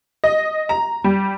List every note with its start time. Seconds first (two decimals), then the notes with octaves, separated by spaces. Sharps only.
0.24 D#5
0.69 A#5
1.04 G3